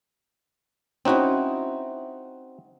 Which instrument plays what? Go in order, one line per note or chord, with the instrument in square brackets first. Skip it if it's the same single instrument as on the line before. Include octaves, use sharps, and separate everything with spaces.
[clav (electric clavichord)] C4 D#4 F#4 [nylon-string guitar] C#4 E4